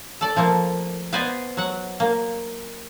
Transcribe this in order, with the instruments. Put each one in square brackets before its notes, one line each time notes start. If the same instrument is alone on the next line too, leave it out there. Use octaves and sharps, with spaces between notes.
[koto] A4 D5
F3 A3 A#3
B3 B4 C5 D5 D#5 G#5
F#3 F#5
A#3